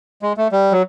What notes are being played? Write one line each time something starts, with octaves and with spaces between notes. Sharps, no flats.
G#3
A3
G3
F#3